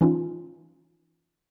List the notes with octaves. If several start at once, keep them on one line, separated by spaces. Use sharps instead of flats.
E3 C#4 D#4 F4